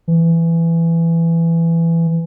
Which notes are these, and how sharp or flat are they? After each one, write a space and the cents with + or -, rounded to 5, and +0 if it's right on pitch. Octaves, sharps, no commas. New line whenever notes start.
E3 +15